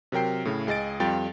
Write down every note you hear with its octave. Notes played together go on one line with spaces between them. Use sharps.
C3 F#3 A#4 G5 C7
A2 C#3 E4
C#2 G#4 D#5 A6 D7
F2 G3 F4 G5 A6